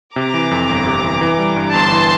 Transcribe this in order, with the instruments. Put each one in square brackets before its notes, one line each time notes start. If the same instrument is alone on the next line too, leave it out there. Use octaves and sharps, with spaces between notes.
[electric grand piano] C3 [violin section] A#5 D6
[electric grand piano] E3
F2
G1
C3
E3
E3
G3
G2
[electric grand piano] G1 [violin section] A5 C6
[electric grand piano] E3